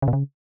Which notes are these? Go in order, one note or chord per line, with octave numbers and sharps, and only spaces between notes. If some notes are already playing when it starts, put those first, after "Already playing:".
C#3
B2
C#3